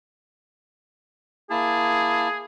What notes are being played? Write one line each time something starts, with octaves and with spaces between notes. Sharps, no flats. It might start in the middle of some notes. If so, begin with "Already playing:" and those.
A#3 E4 G#4 A5